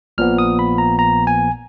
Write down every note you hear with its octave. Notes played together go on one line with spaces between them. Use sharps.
A#1 A#2 F3 B3 F6
D#6
B5
A#5
A#5
G#5